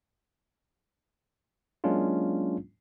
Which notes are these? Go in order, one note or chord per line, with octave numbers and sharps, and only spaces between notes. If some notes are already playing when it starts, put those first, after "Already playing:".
F#3 G#3 A#3 C#4 D4 F4